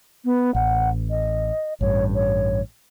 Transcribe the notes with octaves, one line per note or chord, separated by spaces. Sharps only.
B3
A1 F#5
D#5
A1 G2 C#5
C#5